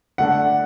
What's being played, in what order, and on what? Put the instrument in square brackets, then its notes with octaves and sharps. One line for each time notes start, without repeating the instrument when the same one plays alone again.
[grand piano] D3 A3 D4 [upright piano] F#5